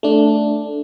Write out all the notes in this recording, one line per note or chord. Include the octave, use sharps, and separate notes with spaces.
A3 D4